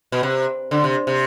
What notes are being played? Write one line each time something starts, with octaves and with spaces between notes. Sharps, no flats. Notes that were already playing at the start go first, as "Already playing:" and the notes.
B2
C3
D3
C3
C3